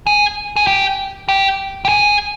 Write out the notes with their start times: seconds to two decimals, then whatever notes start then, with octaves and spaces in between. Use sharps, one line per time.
0.07 G#4
0.56 G#4
0.67 G4
1.29 G4
1.85 G4
1.89 G#4